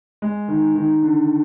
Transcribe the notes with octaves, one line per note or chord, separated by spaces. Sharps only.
G#3
D#3
D#3
D3